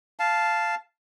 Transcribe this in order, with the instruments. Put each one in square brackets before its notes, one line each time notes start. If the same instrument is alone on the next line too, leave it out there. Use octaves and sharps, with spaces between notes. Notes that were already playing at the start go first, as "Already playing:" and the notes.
[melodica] F5 A5